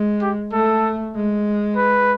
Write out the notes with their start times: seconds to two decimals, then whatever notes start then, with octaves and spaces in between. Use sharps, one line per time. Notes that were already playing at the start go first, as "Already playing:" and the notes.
Already playing: G#3
0.22 G4
0.53 A3 A4
1.15 G#3
1.76 B4